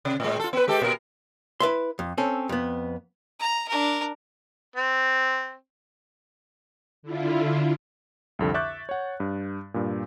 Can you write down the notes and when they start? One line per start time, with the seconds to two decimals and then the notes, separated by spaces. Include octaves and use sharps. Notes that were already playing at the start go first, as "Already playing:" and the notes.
0.05 C3
0.20 A2 G#3
0.40 F4 A4
0.53 B3 B4
0.68 G#3 G4 A4
0.82 A#2 A#4
1.60 E4 B4 E5 C6
1.99 F2
2.18 C4 C#4 A4
2.49 F2 B3
3.40 A#5
3.69 D4 A#4
4.76 C4
7.03 D3 E4 F4
8.39 C2 F2 D3
8.54 E5 C#6 D6 F#6 G6 A6
8.89 C#5 F#5
9.20 G2
9.74 G2 A#2